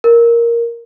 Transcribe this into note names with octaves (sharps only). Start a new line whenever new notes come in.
A#4